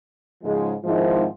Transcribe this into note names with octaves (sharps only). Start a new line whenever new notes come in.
G#2 C#3 F3 G#3
G#2 D#3 F3 G#3 C4 E4